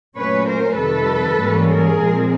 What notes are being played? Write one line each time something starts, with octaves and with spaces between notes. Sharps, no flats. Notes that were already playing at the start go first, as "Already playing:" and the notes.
A#2 F#3 A3 C#4 B4 C#5
A#4 C5
F2 C3 D#3 G3 A4 B4
G#2 E3 G3 A#3 C#4
G#4 A#4
A#2 F3 G#3 C4